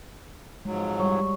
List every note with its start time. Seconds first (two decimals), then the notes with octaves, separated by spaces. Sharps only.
0.65 F2 G#2 F#3 G#3
1.00 G3 C#5 C#6